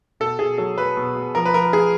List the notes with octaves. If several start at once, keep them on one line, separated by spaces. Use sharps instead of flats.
B2 A4
B2 G#4
F#3 A4
F#3 B4
B2
B2
F3 A#4
B4
F3 A#4
F3 G#4